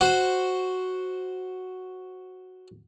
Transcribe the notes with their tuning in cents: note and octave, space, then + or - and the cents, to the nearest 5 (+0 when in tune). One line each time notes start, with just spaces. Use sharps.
F#4 +0 C5 +0